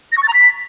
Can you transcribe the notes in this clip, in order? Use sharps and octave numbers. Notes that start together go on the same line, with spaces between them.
A#6
C#6
A6
A#5
B6